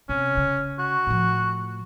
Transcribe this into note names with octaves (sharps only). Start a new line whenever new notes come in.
C3 C#4
C#3
F#4
A2 F3